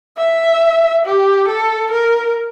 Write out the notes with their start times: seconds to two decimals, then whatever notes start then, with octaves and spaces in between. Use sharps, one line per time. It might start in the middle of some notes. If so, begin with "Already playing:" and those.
0.17 E5
1.05 G4
1.48 A4
1.91 A#4